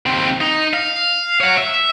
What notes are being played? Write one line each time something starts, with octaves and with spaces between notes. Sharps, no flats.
D#2 C4
D#4
F5
C#5 F#5
E5